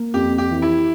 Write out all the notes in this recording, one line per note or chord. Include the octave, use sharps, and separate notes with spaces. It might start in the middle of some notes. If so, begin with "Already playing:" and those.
Already playing: A#3
F2 G4
G4
E3
E4